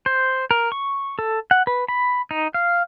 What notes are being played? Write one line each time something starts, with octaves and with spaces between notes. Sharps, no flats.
C5
A#4
C#6
A4
F#5
B4
B5
D#4
F5